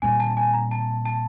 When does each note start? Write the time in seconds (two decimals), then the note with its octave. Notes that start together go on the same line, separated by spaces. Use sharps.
0.02 A#2 G3 C4 G#5
0.20 A5
0.37 G#5
0.53 A#5
0.71 A5
1.05 A5